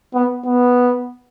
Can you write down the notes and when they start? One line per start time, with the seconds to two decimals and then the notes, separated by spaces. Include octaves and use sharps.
0.14 B3
0.46 B3